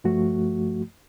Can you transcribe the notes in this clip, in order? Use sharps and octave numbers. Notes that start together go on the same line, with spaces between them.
G2 F3 A3 F#4